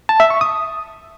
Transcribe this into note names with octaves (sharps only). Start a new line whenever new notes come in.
A5
E5
C#6
D#6